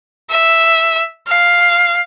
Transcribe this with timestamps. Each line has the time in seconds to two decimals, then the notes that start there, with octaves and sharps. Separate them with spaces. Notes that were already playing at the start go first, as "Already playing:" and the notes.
0.30 E5
1.28 F5